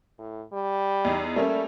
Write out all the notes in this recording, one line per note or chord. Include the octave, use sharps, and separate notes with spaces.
A2
G3
E2 D#4
G3 A3 A#3 C#4